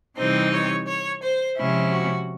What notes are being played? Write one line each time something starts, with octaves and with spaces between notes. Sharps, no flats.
C3 E3 G3 C4 D#4 C5
C#5
C#5
C5
C3 F3 G#3 C#4 E4
F#4